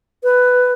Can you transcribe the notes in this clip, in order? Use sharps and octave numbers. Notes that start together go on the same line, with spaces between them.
B4